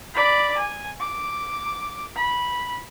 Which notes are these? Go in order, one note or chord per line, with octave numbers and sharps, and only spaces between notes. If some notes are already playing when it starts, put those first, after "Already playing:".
D5 B5
G#5
D6
B5